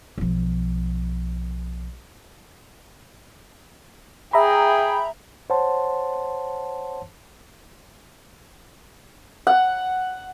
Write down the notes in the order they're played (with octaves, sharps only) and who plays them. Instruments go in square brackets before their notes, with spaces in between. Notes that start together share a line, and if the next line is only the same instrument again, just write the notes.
[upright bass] B1 F3
[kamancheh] G#4 G5 [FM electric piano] E5 A#5 B5
[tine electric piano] C5 C#5 F#5 A5 C6
[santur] F#5